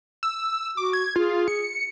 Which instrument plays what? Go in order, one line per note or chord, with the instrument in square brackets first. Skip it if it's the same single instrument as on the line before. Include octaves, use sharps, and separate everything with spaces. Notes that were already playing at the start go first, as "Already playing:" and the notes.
[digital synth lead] E6
[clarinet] F#4 [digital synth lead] D6
[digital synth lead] G#6
[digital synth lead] F4 [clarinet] G#4
[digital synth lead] C#7